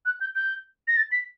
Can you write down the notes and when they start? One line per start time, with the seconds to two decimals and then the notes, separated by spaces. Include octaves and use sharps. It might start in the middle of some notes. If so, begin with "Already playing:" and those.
0.06 F#6
0.21 G6
0.35 G6
0.88 A#6
0.97 A6
1.12 B6